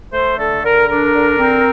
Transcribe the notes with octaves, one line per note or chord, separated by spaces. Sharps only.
A3 C5
D3 A4
D3 A#4
D4 A#4
D3
C4